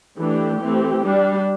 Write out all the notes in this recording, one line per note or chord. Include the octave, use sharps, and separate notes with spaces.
E3 A3 D4 G4
E3 A3 C4
G3 D4